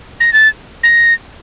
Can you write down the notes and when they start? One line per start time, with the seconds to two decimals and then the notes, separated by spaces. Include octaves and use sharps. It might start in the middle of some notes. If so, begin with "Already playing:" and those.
0.20 A#6
0.33 A6
0.83 A#6